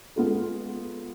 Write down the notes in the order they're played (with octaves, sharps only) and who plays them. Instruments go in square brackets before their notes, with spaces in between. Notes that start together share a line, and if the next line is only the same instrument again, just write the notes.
[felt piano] G#3 B3 F4 A4